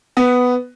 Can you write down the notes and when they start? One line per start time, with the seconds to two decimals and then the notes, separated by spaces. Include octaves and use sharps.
0.17 B3